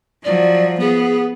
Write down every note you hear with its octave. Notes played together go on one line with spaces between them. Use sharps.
F3 F#3 D5
B3 G#4